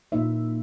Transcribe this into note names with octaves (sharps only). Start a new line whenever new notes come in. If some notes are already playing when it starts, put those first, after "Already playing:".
A#2 A#3 D#4 E5